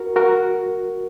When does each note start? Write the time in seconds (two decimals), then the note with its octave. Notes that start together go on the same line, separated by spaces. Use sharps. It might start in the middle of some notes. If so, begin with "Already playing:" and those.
Already playing: F#4 A#4
0.16 F#4 A#4